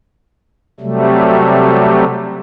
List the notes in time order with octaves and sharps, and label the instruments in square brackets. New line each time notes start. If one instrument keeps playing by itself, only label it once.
[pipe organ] C3 F#3 G3 A3